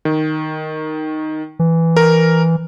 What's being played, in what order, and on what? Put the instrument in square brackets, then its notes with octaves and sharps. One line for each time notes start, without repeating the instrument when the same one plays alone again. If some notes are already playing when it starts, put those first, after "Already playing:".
[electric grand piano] D#3
[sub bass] E3
[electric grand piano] A#4